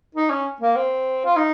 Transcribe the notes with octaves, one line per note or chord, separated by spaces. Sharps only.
D#4
C#4
A#3
C4
F4
D#4